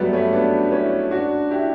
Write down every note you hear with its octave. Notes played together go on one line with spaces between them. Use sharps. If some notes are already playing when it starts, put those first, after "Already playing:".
Already playing: F#3 G3 A3 B3
A3 C#4
B3 D4
C#4 E4
D4 F#4
E4 G4